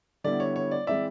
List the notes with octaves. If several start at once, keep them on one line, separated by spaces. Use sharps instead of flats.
D3 G3 B3 E4 D5
C#5
C#5
D5
E3 G#3 C4 E4 D5 E5